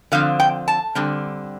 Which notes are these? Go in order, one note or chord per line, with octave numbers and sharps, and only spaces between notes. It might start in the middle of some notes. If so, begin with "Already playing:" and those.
D3 F3 C4 F5
G5
A5
D3 G3 C4